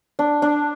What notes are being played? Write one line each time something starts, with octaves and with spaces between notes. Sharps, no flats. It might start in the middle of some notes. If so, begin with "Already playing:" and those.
D4
D4